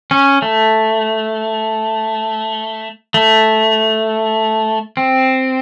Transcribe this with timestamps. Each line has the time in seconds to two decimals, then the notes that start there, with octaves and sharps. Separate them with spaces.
0.11 C#4
0.42 A3
3.14 A3
4.97 C4